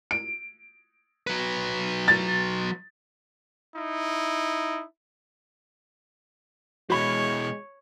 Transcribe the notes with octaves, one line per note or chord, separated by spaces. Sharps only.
D7
F#3 B4
A6
D#4 E4
B2 E3 G#3 F#4 C#5 B5